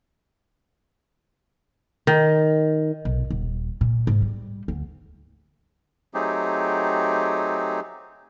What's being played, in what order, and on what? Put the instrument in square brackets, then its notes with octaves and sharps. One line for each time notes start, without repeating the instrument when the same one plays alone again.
[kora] D#3
[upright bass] B1
D#1
A#2
G#2
G3
D2
[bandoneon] F#3 A3 C4 D#4 G4 G#4